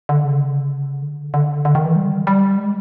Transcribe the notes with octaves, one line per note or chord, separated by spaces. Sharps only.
D3
C#3
D3
D3
D3
D#3
E3
G3
G3
G#3